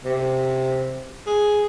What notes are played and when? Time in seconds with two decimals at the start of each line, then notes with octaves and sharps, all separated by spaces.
0.05 C3
1.27 G#4